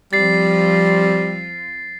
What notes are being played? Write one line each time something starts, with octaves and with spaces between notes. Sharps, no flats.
F3 G3 C4 F4 A6 C7